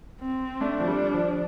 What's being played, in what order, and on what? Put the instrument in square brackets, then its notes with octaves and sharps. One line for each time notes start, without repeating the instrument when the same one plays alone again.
[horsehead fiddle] C4
[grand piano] A3 [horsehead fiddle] D4
[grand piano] F3
G3
F3